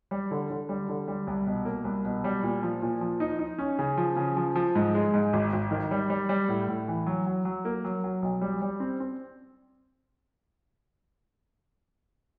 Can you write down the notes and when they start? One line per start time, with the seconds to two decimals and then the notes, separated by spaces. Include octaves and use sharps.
0.11 G3
0.31 D3
0.50 D3
0.69 G3
0.89 D3
1.08 G3
1.27 C2
1.46 B2
1.65 A#3
1.84 C2
2.05 B2
2.24 G3
2.43 A#2
2.63 F3
2.82 A#2
3.01 F3
3.20 D#4
3.39 D#4
3.58 C#4
3.79 C#3
3.97 F3
4.16 C#3
4.37 F3
4.55 F3
4.75 G#2
4.95 G#3
5.14 G#2
5.33 G#1
5.53 G#1
5.71 D#3
5.91 G3
6.10 G3
6.29 G3
6.49 A2
6.68 A2
6.88 E3
7.06 F#3
7.26 F#3
7.45 F#3
7.65 A#3
7.84 F#3
8.04 F#3
8.22 B1
8.41 G3
8.62 G3
8.80 C4
9.00 C4